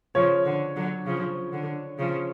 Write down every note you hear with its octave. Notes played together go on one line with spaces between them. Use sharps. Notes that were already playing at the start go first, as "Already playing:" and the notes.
C#3 F3 C#5
D3
D3 F#3
C#3 F3
D3
C#3 F3